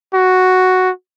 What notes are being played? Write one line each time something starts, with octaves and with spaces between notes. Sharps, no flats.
F#4